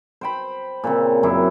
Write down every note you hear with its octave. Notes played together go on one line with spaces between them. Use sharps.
C5 G5 B5
A#2 C#3 C4
F#2 F#3 C4 E4